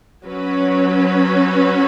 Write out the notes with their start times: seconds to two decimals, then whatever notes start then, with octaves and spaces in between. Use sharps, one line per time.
0.25 F#3 C#4 B4